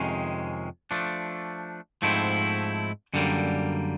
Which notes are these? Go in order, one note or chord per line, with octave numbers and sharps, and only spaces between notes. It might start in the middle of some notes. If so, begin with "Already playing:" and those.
Already playing: F2 C3 D#3 G#3 C#4
F3 A3 D4
G#2 F3 A3 C4 E4
F#2 D3 G3 A#3